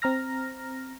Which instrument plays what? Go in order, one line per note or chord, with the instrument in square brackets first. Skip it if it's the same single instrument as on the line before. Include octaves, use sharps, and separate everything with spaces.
[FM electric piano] C4 A#5 F6 A#6